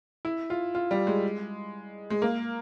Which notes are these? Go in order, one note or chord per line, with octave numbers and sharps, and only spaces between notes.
E4
F4
F4
G3
G#3
G#3
A#3